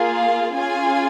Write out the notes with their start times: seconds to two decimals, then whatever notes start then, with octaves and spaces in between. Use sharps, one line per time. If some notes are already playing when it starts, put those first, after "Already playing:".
Already playing: A#3 F4 G#4
0.13 F5
0.54 C#4 F4 G#4 G#5